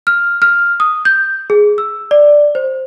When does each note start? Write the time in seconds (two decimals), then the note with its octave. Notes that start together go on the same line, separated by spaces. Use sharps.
0.07 F6
0.42 F6
0.80 D#6
1.05 G6
1.50 G#4
1.78 E6
2.11 D5
2.55 C5